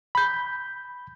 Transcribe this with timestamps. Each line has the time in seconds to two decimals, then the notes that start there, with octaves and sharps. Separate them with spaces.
0.15 B5 G6